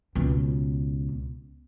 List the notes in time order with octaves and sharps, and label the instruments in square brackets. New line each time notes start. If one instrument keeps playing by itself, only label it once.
[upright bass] C#2 B2